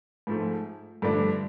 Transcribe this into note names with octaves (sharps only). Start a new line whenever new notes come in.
G#2 F3 A3
G2 D3 F3 A3 D4